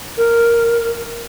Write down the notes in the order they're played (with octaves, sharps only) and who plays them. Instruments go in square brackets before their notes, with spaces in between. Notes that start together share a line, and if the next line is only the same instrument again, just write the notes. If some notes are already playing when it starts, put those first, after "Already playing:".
[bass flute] A#4